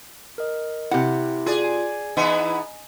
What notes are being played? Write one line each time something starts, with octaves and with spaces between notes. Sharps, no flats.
A#4 D#5
C3 E4 G4 E5 F#5
F4 G#4 D5
G#5
E3 B3 D#4 E4